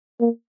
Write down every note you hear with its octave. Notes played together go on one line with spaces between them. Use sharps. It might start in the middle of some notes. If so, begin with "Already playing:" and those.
A#3